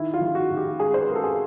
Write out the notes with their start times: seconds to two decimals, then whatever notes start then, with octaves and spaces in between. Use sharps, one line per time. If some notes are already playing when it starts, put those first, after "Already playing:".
Already playing: D#3 E4
0.14 F4
0.21 D#3
0.35 F#4
0.50 D#3
0.57 G4
0.80 G#3 G#4
0.94 C5
1.01 B4
1.08 G#3 A#4
1.15 A4
1.24 G#4